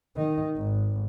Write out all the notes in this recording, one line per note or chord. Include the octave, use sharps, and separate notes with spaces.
D#3 D#4
G#1